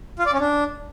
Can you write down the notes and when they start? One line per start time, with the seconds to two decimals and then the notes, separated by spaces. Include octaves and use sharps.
0.19 F4
0.26 D5
0.33 C#4
0.40 D4